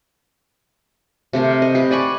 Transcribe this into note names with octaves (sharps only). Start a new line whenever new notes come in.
C3 A3 A#4
D#5
G4 B4
D5 G#5 B5 C#6